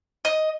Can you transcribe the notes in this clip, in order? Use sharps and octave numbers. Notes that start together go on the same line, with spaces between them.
D#5